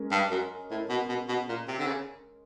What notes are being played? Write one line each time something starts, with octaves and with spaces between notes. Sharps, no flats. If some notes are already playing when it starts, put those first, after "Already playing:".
Already playing: G#3 C#4 A#4
G2
F#2
A2
B2
B2
B2
A#2
C3
D3
C#3